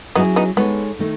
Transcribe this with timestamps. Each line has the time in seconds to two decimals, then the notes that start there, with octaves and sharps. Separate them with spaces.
0.15 F#3 B3 C#4 D#4 E4 G#4
0.36 B3 D#4
0.56 G#3 B3 D#4 A4 C#5
0.99 D#3 A3 D#4